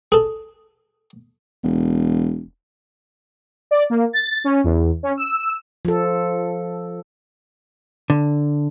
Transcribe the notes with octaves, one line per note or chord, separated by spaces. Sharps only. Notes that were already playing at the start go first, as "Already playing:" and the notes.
G#4 A4
E1
D5
A#3
A6
C#4
E2
C#4
E6
F3 A4
D3